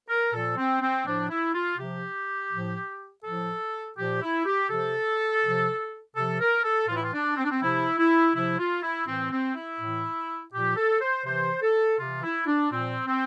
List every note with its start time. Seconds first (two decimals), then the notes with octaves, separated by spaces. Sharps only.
0.09 A#4
0.33 A#2 F3 A4
0.57 C4
0.81 C4
1.06 A2 F3 D4
1.30 E4
1.55 F4
1.78 C3 F3 G4
2.51 A2 F3
3.24 A2 F3 A4
3.97 A#2 F3 G4
4.22 E4
4.45 G4
4.69 C3 F3 A4
5.43 C3 F3
6.15 C3 F3 A4
6.41 A#4
6.64 A4
6.88 A2 E3 F4
6.95 E4
7.03 F4
7.13 D4
7.37 C4
7.45 D4
7.51 C4
7.61 C3 F3 E4
7.97 E4
8.34 C3 F3 E4
8.59 F4
8.83 E4
9.07 A2 E3 C4
9.31 C4
9.55 E4
9.80 A2 E3
10.53 A#2 F3 G4
10.77 A4
11.01 C5
11.25 C3 E3 C5
11.62 A4
11.99 C3 E3 F4
12.23 E4
12.47 D4
12.71 A#2 F3 C4
13.07 C4